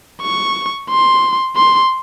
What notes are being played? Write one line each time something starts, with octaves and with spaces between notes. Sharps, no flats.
C#6
C6
C6